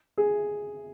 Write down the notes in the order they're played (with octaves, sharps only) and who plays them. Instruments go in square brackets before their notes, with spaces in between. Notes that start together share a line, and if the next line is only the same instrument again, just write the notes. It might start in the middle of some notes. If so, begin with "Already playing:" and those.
[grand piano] G#4